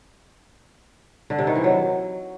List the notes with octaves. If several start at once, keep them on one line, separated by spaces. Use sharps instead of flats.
D3
C3
D#3
E3
F#3